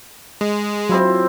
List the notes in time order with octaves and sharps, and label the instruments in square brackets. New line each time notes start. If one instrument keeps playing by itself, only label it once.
[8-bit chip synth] G#3
[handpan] F#3 [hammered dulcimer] C4 E4 F4